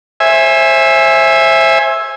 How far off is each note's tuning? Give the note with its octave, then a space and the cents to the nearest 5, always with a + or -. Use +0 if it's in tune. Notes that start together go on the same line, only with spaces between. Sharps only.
C5 +35 E5 +0 G#5 +0